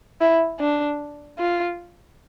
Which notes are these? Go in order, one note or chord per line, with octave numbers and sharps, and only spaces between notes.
E4
D4
F4